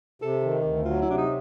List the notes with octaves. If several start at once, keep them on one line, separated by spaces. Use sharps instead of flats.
C3 A4
D#3
D2
F#3 F4
E4
C3 D4
D#4